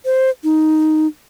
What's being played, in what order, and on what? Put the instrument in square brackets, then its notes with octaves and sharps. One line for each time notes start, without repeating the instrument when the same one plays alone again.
[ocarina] C5
D#4